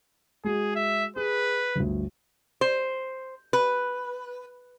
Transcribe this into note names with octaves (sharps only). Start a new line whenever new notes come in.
G#3 F#4 G#4
E5
G#4 B4
G1 D2
C5
B4